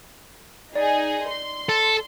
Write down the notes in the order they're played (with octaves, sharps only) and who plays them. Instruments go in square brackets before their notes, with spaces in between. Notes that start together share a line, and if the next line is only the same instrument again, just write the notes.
[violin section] D#4 G#4 [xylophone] D5
[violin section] C6
[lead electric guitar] A4